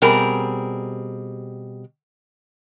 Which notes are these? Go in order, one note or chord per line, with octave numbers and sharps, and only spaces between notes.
B2 G3 C4 G#4 A#4